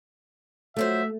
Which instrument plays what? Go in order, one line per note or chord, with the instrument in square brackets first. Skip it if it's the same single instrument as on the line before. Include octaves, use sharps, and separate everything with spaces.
[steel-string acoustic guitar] F3 F#3 C5 [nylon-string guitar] A3 [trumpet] E5